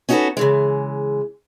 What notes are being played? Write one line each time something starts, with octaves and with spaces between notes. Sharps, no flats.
C#4 D#4 F#4 G4 A4 B4
C#3 E3 G#3